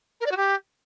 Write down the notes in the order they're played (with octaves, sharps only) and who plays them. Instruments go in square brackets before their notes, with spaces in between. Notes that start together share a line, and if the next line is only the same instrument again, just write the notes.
[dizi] A#4
D5
F#4
G4